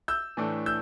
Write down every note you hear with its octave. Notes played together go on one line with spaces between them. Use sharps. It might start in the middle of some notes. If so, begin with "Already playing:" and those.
E6 G6
A2 E3 A3 D4
E6 G6